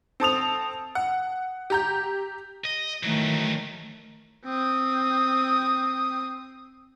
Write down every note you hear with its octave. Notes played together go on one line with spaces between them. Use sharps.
C4 A4 D#6 F7
F#5
G4 A#5 G6
D#5
D#3 E3 F#3 A3
C4 D#6